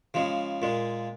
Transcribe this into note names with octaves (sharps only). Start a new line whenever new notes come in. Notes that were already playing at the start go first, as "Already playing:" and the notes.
C#3 F3 G#3
A#2 G#3